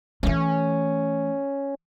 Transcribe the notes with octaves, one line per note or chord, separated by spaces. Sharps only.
E3 A3 C#4